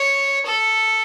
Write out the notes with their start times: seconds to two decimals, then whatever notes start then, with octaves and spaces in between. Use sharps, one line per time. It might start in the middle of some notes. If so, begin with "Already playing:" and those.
Already playing: C#5
0.46 A4